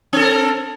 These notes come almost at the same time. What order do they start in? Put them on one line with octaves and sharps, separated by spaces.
C4 A4 A#4